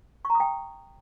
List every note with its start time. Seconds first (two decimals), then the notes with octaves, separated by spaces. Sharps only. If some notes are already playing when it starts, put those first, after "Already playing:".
0.25 C#6
0.30 A#5
0.35 D#6
0.40 G5